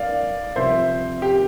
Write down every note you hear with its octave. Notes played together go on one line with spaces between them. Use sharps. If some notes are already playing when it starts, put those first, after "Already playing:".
Already playing: D5 F5
C3 F3 C4 C5 E5
G4